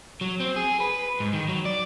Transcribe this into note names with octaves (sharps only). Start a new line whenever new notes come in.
F#3
C4
G#4
B4
G#2
D#3
F#3
D5